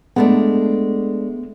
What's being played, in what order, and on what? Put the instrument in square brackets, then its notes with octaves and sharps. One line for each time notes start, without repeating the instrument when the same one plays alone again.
[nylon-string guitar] G#3 A3 D4 [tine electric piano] B3